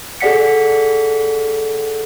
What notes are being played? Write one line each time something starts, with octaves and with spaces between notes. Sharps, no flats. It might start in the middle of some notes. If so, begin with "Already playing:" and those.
G#4 A4 D5 F#5 B6 C#7